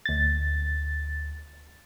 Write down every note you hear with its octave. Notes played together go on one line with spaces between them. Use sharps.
D2 A6